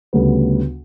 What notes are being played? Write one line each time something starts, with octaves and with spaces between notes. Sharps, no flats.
D2 C#3 G3 B3